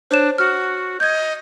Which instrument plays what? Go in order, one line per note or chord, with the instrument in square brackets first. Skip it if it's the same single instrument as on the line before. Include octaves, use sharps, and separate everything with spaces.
[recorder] D4 [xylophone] C5 C#5 E7
[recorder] F#4 [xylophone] F6
[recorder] D#5 [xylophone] G6 G#6